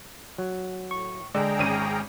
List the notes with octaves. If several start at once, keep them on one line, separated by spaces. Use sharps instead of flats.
F#3
A2 C#6
D3 G#3 G#4 D5 G5 A#5
G#1 C#4 D#7